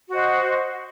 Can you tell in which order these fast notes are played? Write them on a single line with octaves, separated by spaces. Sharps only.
F#4 C5 D#5